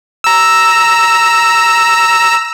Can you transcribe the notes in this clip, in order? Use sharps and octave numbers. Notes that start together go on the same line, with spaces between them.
A#5 E6